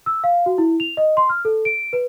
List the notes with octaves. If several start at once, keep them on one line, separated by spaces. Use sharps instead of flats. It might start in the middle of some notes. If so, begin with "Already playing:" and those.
E6
F5
F#4
E4
F7
D#5
C6
F6
A4
D7
B4